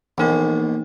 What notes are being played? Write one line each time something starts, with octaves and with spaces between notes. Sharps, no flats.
A#1 D#2 B2 E3 D#4